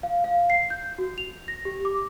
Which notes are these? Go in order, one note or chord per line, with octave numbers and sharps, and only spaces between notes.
F5
F5
C7
G6
F#4
F7
A#6
G4
D6